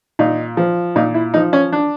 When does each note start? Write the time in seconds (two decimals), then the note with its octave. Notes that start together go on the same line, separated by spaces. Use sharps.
0.19 A#2 D#4
0.57 F3
0.96 A#2 D#4
1.14 E4
1.34 F3 D#4
1.53 C#4
1.73 D4